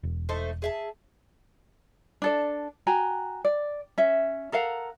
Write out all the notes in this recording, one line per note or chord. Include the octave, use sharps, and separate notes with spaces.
E1
A3 D#4 C5
G#4 E5 A5
D4 A4 D5
F#4 G5 G#5 A#5
D5
C#4 E5
A4 A#4 F5 F#5